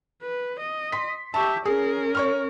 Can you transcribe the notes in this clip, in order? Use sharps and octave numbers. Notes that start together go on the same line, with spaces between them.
B4
D#5
C6 B6
G4 E5 A5 C#6
C#4 G#4 A#4
C#5 C#6 F6